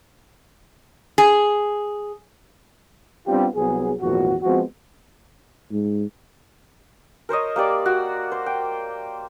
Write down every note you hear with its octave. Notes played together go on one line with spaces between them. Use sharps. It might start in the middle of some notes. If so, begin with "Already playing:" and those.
G#4
G3 B3 C4 D4 F4 G4
C2 F#3 B3 G#4
G#1 E2 A#2 F3 F#4
F3 G#3 B3 C4 F#4
G#2
A#4 C5 C#5 D#5
A#3 G4 D5 D6
F#4
C5
G5